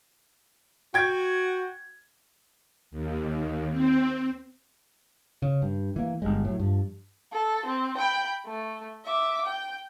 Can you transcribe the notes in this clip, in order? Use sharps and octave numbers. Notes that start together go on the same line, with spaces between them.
F#4 G5 G#6
D#2
C4
C#3
G2
E3 A#3
G1 D#2 G3 G#3
A2 F#3
G2 F3
A4
C4
G5 B5
A3
E5 D6
G5